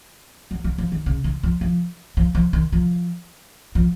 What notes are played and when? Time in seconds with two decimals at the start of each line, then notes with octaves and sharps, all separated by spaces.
0.51 F#3
0.64 F#3
0.78 F3
0.92 D#3
1.06 C#3
1.24 D#3
1.43 F3
1.61 F3
2.17 F3
2.35 F3
2.53 D#3
2.72 F3
3.75 F3